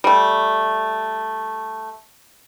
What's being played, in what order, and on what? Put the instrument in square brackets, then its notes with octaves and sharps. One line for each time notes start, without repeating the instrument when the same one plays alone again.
[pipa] G3 A3